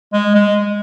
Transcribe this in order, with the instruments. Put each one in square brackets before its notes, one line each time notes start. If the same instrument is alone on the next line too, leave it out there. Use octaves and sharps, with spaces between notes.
[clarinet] G#3
G#3